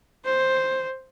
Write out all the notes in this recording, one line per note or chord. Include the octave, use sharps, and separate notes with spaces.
C5